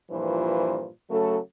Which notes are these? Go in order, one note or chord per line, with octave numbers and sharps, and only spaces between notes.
G2 A#2 E3 F3 F4 C5
C#3 F#3 A3 A4